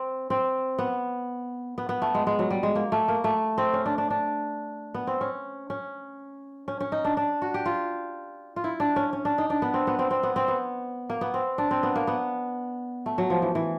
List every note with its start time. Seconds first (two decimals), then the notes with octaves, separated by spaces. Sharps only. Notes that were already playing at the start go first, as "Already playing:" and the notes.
Already playing: C4
0.30 C4
0.79 B3
1.78 B3
1.89 B3
2.02 A3
2.14 G#3
2.27 G#3
2.39 F#3
2.51 G3
2.63 G#3
2.75 A#3
2.92 A3
3.08 A#3
3.24 A3
3.58 C4
3.73 C#4
3.86 D4
3.98 D4
4.10 D4
4.94 B3
5.07 C4
5.21 C#4
5.70 C#4
6.68 C#4
6.80 C#4
6.92 D#4
7.04 D4
7.17 D4
7.42 F#4
7.54 G4
7.66 F4
8.56 F4
8.64 E4
8.80 D4
8.96 C#4
9.13 C#4
9.25 D4
9.38 D#4
9.50 D4
9.62 B3
9.74 C4
9.87 B3
9.99 C4
10.11 C4
10.23 B3
10.36 C4
10.48 B3
11.10 A#3
11.21 B3
11.34 C4
11.58 D4
11.71 C4
11.83 B3
11.95 A#3
12.07 B3
13.06 A3
13.18 F#3
13.30 F3
13.42 E3
13.55 E3